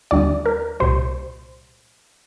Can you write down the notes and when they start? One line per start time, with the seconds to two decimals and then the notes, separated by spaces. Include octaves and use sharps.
0.11 D#2 D3 G3 D5
0.46 A#4
0.80 C2 A#2 G3 C5